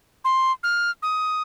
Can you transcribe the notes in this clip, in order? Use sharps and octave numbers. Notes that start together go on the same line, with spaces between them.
C6
F6
D#6